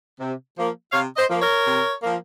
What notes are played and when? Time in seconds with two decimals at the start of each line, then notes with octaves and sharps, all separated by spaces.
0.19 C3
0.56 F3 A#3
0.92 C3 C#5 F5
1.17 C5 D#5
1.28 F3 A#3
1.41 A#4 C#5
1.65 C3
2.02 F3 A#3